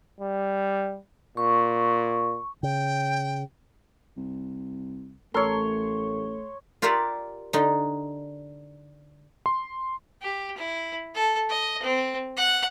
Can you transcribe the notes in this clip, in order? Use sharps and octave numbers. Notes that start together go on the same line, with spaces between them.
G3
A#2 C#6
C#3 G5
C2
A1 A3 A4 A#4 C#5 C6
F4 G4 A#4 D5 E5 F#5
D3 D#4
C6
G4
E4
A4
D#5
C4
F#5